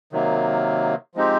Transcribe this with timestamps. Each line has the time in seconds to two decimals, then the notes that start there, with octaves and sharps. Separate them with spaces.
0.12 C3 D#3 F#3 A#3
1.15 F3 G#3 C4 D#4 G4